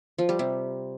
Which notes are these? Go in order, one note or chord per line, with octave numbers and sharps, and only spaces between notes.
F3
G3
C3